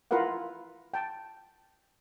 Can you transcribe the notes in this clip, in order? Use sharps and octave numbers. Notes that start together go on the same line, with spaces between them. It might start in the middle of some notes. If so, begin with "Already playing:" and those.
E4 F4 A#4 B4 F5 F#5
G5 A5